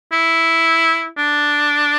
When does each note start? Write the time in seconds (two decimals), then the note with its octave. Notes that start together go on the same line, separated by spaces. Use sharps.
0.12 E4
1.18 D4